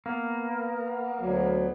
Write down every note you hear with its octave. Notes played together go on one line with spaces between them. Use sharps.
A#3 B3
D2 F#3